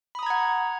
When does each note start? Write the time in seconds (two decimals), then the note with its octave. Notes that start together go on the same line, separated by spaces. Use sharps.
0.15 B5
0.19 D#6
0.23 A#5
0.26 G#6
0.30 F#5